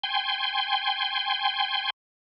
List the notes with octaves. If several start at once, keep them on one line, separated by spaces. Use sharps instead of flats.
G5 G#5 C6